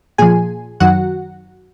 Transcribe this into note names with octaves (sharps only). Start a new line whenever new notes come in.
A#2 F3 G#4 G#5
F#2 D#3 F#3 F#4 F#5